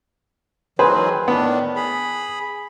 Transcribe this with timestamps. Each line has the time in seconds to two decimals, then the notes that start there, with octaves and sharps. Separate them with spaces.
0.79 D#3 E3 F#3 G#4 B4 C5
1.28 A2 D#3 B3 D4
1.76 G#4 B5